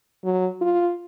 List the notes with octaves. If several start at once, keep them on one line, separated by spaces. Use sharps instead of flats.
F#3
F4